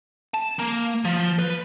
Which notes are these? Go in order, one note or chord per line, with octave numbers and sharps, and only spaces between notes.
A5
A#3
F3
B4